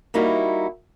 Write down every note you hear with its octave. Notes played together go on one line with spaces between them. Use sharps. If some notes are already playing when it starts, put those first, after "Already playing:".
G3 A#3 D#4 E4 F#4